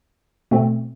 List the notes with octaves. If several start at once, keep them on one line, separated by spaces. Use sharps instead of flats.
B2 A3 C4